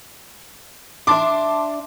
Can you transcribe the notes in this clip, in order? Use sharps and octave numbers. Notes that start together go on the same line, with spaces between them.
D4 E5 A5 C6 D6